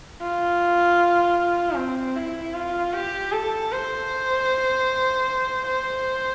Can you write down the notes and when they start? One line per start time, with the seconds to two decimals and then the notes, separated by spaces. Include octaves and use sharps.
0.21 F4
1.76 C4
2.16 E4
2.54 F4
2.93 G4
3.32 A4
3.72 C5
5.67 C5